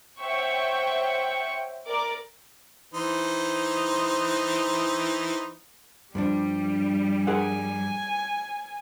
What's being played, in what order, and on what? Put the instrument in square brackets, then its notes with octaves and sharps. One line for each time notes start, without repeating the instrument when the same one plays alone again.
[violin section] C5 C#5 E5 F#5 G5 C#6
A#4 D5 D6
[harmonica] E3 D#4 C5
[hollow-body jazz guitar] G2 F3 D4 [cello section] G3
[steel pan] G#4 A#4 F#5 [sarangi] G#5